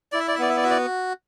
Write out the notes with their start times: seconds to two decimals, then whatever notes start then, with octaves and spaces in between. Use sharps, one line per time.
0.12 E4 D5
0.20 E5
0.28 D5
0.35 E5
0.39 B3 D5
0.49 E5
0.57 D5
0.63 F#4 E5
0.70 D5